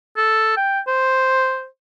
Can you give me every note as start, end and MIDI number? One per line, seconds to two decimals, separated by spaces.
0.17 0.53 69
0.57 0.80 79
0.87 1.66 72